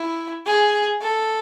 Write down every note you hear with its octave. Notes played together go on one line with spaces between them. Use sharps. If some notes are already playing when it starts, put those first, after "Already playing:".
Already playing: E4
G#4
A4